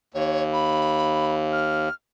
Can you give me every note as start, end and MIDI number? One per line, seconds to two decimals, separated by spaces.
0.14 1.89 39
0.14 0.43 73
0.53 1.33 83
1.52 1.93 89